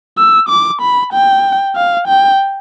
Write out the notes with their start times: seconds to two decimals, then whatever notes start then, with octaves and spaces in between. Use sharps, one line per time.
0.18 E6
0.49 D6
0.81 B5
1.13 G5
1.76 F5
2.08 G5